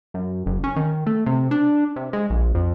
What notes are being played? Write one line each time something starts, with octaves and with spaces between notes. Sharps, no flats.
F#2
F#1
C#4
D#3
A3
C3
D4
C3
G#3
A#1
F2